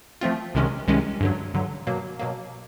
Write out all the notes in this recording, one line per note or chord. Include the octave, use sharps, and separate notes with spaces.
F3 A3 C4 F4
C2 C3 D#3 G#3 C#4
C2 C3 D#3 G#3 C#4
G2 D3 F#3
G2 D3 F#3
B2 F#3 A#3
B2 F#3 A#3